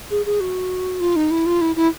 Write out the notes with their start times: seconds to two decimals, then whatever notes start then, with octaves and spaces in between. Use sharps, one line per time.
0.11 G#4
0.26 G#4
0.40 F#4
1.00 F4
1.16 D#4
1.31 E4
1.46 F4
1.61 E4
1.76 E4